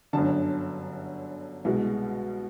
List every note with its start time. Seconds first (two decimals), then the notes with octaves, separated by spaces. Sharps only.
0.13 G1 F#2 D3 A5
1.65 C2 B2 G#3